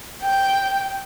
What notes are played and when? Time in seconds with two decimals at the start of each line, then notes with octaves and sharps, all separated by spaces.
0.21 G5